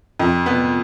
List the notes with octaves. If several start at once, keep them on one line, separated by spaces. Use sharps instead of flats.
F2
B3